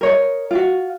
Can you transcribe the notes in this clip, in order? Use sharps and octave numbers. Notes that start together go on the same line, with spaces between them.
A#4 C#5 D#5
F4 F#4